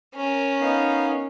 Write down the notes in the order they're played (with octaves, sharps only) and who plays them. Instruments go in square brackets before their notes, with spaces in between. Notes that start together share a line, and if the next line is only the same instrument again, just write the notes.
[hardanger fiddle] C#4 A#4
[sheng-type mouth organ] B3 D#4 F5